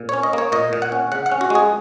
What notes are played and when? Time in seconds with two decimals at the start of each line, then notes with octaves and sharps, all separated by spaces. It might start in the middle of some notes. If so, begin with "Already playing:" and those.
Already playing: A#2
0.09 C#4 C#5
0.23 D#5
0.33 A#3 C#5
0.52 A#2 D#5
0.73 A#2
0.82 F#5
0.92 C#4
1.12 C#3 F#5
1.26 F#5
1.32 C#4
1.41 F#4
1.50 G#3 G#4